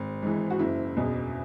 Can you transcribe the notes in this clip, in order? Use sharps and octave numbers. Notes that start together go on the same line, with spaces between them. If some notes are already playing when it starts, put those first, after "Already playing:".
Already playing: G#1
G#2 E3
F#4
F#1 E4
E2 B2